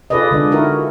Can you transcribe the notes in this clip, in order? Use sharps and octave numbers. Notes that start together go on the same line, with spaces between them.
F4 G#4 A4 B4 D5 D#5
D3 G#3 D4
D#4 E4 F#4 A#4